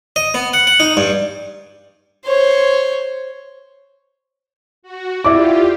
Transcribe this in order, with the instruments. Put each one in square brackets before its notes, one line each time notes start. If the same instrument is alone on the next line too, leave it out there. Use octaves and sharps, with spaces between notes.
[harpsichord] D#5
B3
F#5
F#5
D#4
G2
[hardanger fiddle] C5 C#5
[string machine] F#4
[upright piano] E4 D5 D6 [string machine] F4 G4